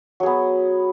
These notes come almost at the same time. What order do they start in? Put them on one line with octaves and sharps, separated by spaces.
F#3 G#4 B3